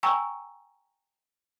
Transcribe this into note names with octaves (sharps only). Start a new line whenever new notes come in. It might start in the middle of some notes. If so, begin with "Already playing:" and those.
G5 G#5 A#5 C#6 E6